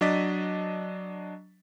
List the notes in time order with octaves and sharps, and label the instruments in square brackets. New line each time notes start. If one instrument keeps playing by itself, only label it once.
[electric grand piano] F#3 D4 D#5 D6 A6 B6